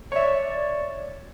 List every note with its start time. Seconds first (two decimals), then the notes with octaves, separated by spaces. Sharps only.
0.12 C#5 D5 E5